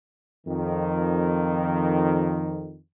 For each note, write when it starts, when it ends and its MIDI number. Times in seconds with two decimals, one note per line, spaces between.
0.47 2.79 41
0.47 2.79 51